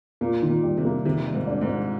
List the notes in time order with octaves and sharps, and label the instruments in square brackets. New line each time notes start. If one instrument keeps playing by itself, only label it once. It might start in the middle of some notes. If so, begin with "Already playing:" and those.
[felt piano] A#2 [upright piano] A#3
[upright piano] D#3
[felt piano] A#2
[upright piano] G3
[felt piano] C3
[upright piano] A#3
[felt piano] C3 [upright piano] D#3
[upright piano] G3
[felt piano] G#2
[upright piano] D4
[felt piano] G#2
[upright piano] D4